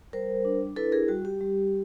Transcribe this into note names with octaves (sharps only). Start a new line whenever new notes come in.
G3 A#4 C5
D4
E4 A4 B4
G#4 A#4
G3 F#4
G4
G3